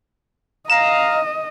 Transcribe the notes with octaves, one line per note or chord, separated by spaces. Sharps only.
D#5 F5 A#5 E7